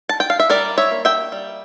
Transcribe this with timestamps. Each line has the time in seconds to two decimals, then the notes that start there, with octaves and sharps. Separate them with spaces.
0.09 A5
0.20 G5
0.30 F5
0.40 E5
0.50 G3 A#4 D5
0.78 C#5 E5
0.91 A#3
1.05 E5 G5
1.32 G3